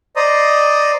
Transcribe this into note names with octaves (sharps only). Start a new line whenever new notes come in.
C5 D5 D#5 A#5 D#6